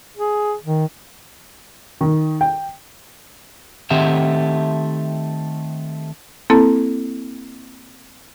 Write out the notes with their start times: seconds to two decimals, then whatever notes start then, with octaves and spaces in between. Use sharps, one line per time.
0.17 G#4
0.64 D#3
2.01 D#3
2.41 G5
3.90 D#3 A3 C4 G4 E5 F#5
6.50 A#3 C4 E4 A4 A5